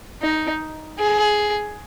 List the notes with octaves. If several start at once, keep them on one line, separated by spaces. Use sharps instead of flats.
D#4
G#4